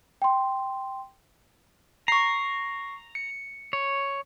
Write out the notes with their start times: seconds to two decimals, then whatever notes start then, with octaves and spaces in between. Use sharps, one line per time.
0.22 G5 C6
2.08 A#5 C#6 C7
3.15 C#7
3.73 C#5